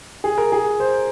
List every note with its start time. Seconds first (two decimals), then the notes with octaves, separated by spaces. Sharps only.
0.24 G#4
0.38 A#4
0.52 G#4
0.80 C5